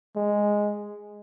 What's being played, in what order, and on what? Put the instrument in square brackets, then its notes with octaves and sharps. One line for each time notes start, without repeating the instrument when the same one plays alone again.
[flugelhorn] G#3